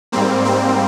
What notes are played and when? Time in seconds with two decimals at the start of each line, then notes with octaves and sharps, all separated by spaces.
0.12 G#2 G3 A#3 C4
0.45 C4